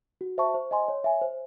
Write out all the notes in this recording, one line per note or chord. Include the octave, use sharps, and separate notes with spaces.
F#4
C5 E5 A5 C#6
C5
D#5 G#5 C6
C#5
E5 G#5
C5